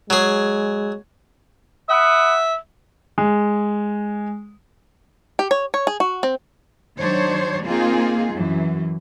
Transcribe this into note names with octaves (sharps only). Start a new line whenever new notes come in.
F#3 G#3 G#4
E5 F#5 B5 D#6
G#3
G4
C#5
C#5
G#4
F#4
C4
D#3 F#3 D4 C5 C#5
A#3 C4 D#4 F4 G#4
F#2 E3 F#3